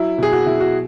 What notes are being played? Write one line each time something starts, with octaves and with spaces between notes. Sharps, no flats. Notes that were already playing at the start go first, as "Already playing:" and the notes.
Already playing: F#3 E4
B2 G#4
F#4
B2 E4
F#4